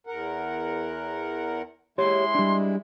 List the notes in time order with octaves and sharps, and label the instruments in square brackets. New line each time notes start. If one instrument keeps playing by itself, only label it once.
[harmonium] E2 A#4 F#5
[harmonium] G#3 E4 [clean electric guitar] G4 C#5 [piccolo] C6
[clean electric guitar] G3 D4